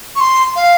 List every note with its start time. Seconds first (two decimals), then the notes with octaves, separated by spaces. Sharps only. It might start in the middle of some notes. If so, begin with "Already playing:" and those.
0.16 C#6
0.20 C6
0.56 F5